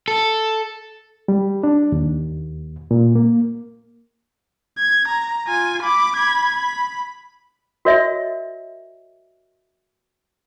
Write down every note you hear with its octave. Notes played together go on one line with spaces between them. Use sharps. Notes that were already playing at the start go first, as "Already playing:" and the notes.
A4
G3
D4
D#2
A#2
A#3
G#6
A#5
F4 G#5
B5 D6
B5 G#6
B5
F#4 A#4 C#5 D#5 E5